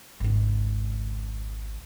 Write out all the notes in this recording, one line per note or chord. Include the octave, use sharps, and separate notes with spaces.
G#1 C#2